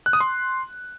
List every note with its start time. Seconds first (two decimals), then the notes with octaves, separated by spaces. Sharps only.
0.06 F#6
0.13 D#6
0.20 C6